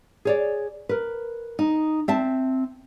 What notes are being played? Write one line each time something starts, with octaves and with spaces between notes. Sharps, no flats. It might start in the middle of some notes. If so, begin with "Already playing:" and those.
G#4 C#5 D5
A#4 B4
D#4
C4 E5 A5